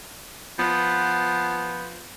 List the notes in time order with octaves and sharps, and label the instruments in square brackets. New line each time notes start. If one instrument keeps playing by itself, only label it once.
[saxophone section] F3 B3